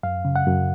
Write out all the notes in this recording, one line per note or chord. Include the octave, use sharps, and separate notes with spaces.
F#2 F5
C#3
F#5
F#2